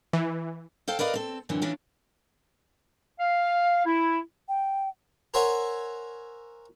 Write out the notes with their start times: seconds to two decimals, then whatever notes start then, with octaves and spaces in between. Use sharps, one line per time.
0.13 E3
0.88 A4 C5 F5 G5
0.99 A#4 B4 D5 D#5 F5
1.14 C4 A4
1.49 F#2 D3 E3 C4
1.62 E3 C#4 D4 E4 F4
3.20 F5
3.86 E4
4.49 G5
5.34 A#4 C5 C#5 E5 F#5 G#5